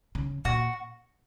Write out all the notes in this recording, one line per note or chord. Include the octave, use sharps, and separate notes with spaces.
C#3
A#2 F#4